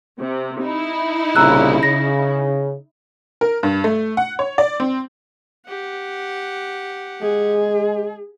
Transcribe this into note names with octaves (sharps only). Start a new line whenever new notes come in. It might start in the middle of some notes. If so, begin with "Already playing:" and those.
C3
D#4 E4
C2 A#2 C#3 A#5 E6 F#6
C#3 A#6
A#4
G2
A3
F#5
C#5
D5
C4
G4 F#5
G#3 G#4